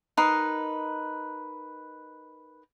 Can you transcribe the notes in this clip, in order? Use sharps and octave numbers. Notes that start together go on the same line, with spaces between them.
D#4 A#4 B4 C6